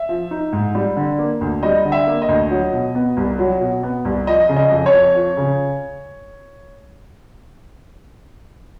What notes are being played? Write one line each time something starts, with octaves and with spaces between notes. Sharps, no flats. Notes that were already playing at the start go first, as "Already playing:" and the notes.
Already playing: E5
F3
D#4
G#2
G3
D3
A#3
D2
G3 D#5
D3
E5
A#3
D#5
D2
F#3
B2
B3
C2
F#3
B2
B3
C2
F3 D#5
C#3
D#5
F2
C#5
F2
F3
C#3